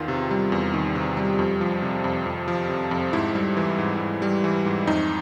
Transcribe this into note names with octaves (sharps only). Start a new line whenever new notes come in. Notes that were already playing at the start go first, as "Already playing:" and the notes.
Already playing: E2 D#3 F4
C3
G3
E2
D#3
C3
G3
F2
F3
C3
F2
F2
F3
C3
F2
G#2 E4
G3
E3
G#2
G#2
G3
E3
G#2
F2 D#4